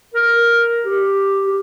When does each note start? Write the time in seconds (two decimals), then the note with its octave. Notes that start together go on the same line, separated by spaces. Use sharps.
0.14 A#4
0.85 G4
1.47 G4